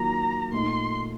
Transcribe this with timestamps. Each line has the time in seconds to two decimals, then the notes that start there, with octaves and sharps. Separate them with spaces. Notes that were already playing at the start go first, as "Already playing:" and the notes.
Already playing: D#3 F#3 A#3 F4 A#5
0.52 A#2 A3 D#4 C6